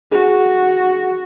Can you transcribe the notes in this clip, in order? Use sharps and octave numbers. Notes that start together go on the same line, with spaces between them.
F#4 G#4